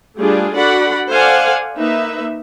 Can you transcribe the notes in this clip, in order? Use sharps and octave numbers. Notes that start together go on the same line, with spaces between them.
G3 A3 D4 F4 G#4
D4 F#4 A4 D5 F#5 B5
A4 C5 D5 F5 F#5 G#5
A#3 D#4 B4 E5